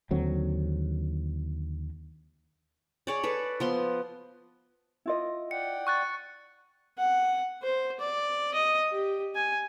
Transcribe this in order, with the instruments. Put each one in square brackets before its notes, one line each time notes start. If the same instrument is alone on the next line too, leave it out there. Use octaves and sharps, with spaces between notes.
[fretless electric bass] D#2 D3 F#3 C4
[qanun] G#4 C#5 D5
A4 B4
F3 B3 C6
[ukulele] E4 F4 D#5
[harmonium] D5 F#5 G5 [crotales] C#7
[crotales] C#6 F#6 A6
[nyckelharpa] F#5
C5
D5
D#5
G4
G#5